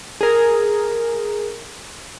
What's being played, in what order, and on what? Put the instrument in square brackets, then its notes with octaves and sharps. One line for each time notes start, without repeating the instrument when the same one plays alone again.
[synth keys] G#4 A#4